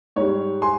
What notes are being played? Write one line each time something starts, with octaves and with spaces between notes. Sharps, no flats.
G#2 G3 C#5
G#5 C6